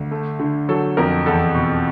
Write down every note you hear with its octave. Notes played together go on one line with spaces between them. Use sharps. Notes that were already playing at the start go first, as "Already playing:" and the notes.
Already playing: D2
A3
D3
F#3 A4
F2 A#4
E2 A4
B2